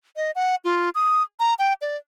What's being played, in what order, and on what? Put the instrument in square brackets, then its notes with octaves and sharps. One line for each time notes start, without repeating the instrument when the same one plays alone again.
[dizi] D#5
F#5
F4
D#6
A#5
G5
D5